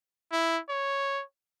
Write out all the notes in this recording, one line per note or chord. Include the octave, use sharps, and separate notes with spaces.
E4
C#5